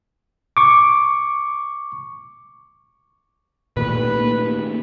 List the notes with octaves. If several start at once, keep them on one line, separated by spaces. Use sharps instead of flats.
C#6 D6
A#2 D#3 A3 B4
A#3